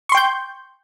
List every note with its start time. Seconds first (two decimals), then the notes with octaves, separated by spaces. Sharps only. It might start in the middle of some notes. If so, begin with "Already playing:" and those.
0.09 C#6
0.12 C6
0.15 G5
0.17 G6